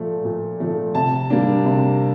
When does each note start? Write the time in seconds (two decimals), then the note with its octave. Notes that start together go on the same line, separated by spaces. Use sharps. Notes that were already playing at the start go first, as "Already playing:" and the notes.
Already playing: A#2 F3 A3
0.25 A#2
0.60 F3 A3
0.95 C3 A5
1.30 G3 A#3 D4
1.65 C3